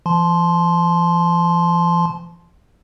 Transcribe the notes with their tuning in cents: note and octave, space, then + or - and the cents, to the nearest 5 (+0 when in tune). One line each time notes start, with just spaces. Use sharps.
F3 -45 A5 -25 C6 +0